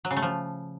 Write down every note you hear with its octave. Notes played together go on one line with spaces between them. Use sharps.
F#3
C#3
A3
F3